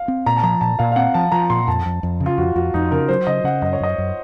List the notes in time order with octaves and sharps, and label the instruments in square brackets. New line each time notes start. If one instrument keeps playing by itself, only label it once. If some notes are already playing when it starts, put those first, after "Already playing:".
Already playing: [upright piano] F5
[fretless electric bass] C4
[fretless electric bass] A#2 [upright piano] A#5
[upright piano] A5
[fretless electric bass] F3 [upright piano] A#5
[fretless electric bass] A#2 [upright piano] A5
[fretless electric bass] A#2 [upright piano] F5
[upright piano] F5
[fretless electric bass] C4 [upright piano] F#5
[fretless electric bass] F3 [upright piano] A5
[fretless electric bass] F3 [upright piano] A#5
[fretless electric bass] A#2 [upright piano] C6
[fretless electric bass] F2 [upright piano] A5
[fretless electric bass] F2
F2
C#3
[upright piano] F4
[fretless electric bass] F2 [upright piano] F#4
[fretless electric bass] F2 [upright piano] F#4
[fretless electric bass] F2 [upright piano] D#4
[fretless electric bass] C#3 [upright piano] A#4
[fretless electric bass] F#3 [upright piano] C5
[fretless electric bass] C#3 [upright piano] D#5
[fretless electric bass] C#3 [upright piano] F#5
[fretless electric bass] F#2 [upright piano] D#5
[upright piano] C#5
[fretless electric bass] F#2 [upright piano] D#5
[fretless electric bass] F#2